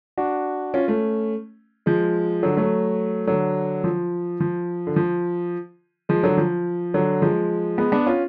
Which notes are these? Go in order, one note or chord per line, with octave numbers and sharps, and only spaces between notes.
D4 F#4
C#4 F4
A3 C#4
F3 G#3
D3 F#3
F#3 A3
D3 F#3
F3
F3
D3
F3
F3 G#3
D3 F#3
F3
D3 F#3
F3 G#3
G#3 B3
B3 D4
C#4 F4